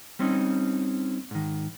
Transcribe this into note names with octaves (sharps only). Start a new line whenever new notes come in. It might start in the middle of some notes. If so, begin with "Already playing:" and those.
G3 C4 C#4 D#4
G#2 D#3